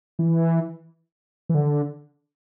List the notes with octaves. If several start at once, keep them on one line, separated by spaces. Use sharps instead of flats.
E3
E3
D3